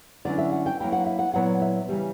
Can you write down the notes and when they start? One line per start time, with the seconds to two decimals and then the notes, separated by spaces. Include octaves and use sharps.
0.25 D3 F#3 C#4 E4 D5
0.38 E5
0.52 F#5
0.66 G5
0.80 F#3 A#3 E4 G5
0.92 F#5
1.06 E5
1.19 F#5
1.34 A#2 F#3 B3 E4 F#5
1.62 E5
1.88 C#3 E3 G3